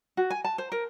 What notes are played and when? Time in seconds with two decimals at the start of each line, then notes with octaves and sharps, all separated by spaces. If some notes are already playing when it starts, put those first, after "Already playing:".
0.17 F#4
0.31 G#5
0.45 A5
0.58 C5
0.72 A#4